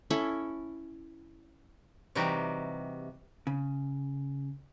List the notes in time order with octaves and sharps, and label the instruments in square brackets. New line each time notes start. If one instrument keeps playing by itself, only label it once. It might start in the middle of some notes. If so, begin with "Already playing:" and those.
[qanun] C#4 E4 A4
[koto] C3 E3 G3 D#4 F#4 G4
[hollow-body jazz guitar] C#3